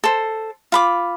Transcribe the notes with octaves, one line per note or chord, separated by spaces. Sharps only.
A4 C5
F4 B5 D6